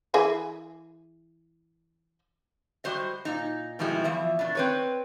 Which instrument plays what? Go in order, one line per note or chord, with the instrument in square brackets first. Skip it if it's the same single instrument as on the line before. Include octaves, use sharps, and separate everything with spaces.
[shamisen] E3 E4 G#4
[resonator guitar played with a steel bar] G3 F#4 C5 D#5
A#2 D#4
B2 F3 G3 G#3 E4
E2 F3 E5
B2 D4
C4 B4 C#5